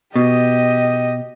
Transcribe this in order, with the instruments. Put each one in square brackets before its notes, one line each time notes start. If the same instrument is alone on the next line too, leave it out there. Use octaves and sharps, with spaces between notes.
[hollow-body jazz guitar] B2 [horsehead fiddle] G4 D#5